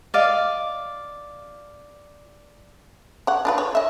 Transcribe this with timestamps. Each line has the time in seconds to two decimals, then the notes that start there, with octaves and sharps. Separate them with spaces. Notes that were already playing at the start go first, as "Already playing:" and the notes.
0.14 D5 D#5 F5
3.27 C#5 F#5
3.45 D4 F4 B4
3.58 C#5
3.75 D#5 E5